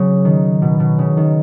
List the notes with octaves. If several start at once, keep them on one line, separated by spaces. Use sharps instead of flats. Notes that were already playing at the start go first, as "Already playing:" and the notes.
Already playing: C#3 F#3
D#3
B2
B2
C#3
D#3